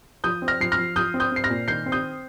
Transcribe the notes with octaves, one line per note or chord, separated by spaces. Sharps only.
F3 D#6 G6
C4
F6 A#6
F3 C7
F6 A#6
F3
F3 D#6 G6
C4
D#6 G6
C4 C7
F6 A#6
A#2
D#3 G6 C7
C4
D#6 G6